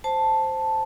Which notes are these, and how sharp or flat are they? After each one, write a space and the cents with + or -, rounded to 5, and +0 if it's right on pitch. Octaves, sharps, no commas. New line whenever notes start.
C5 +0 A5 +0